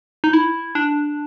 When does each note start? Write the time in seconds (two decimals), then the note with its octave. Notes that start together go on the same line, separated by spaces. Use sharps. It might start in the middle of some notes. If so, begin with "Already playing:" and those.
0.24 D#4
0.33 E4
0.75 D4